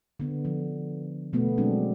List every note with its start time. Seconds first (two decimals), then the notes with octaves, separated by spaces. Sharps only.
0.20 D3 B3
0.45 F3
1.33 B2 A3 B3
1.58 F#3 G#3 C4 D4